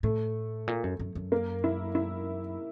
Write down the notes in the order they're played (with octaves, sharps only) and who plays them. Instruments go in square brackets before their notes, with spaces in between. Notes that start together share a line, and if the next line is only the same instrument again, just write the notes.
[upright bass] A2 [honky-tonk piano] A3
[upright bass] A#2
F#2
F#2
F#2
[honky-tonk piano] A#3
E4
E4